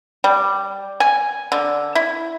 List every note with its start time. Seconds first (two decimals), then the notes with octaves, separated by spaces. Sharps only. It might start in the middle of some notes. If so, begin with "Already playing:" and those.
0.24 G3
1.00 G#5
1.52 D3
1.95 E4